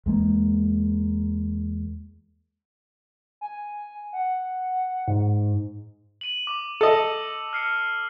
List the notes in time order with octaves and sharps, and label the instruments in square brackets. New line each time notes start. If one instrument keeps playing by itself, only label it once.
[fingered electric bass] E2 G#3 A#3
[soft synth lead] G#5
F#5
G#2
[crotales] D#7 F#7
D6
[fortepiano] A4 D#5 [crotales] E6
[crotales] F6 C7 C#7